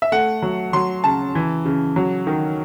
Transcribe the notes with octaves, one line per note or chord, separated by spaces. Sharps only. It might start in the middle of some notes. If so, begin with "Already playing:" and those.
E5
A3 F#5
F#3
F#3 C6
C#3 A5
E3
C#3
F#3
D#3